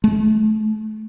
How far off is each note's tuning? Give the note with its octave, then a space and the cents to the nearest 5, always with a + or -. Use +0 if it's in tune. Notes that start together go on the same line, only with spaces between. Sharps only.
A3 -30